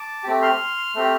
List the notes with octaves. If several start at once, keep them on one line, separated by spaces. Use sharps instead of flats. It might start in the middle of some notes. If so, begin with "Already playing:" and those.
Already playing: A5 D6
A3 C4 G4
C6 F6
A3 C4 G4